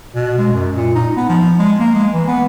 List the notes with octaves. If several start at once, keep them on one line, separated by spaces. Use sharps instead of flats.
B2
G#3
F#2
A#2
D#4
B3
F3
G#3
A#3
G#3
E3
B3